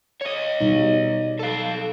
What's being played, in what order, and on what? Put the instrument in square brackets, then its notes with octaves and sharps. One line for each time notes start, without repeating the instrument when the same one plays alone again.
[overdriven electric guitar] C#5 D#5
[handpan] B2 G3 D#4
[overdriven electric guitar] A4 F5